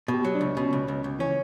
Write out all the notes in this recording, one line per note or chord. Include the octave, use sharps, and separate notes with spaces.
B2
G4
F#3
D4
C#2
B2 C#4
C#2
C#2 C#4
C#2
E3 C#4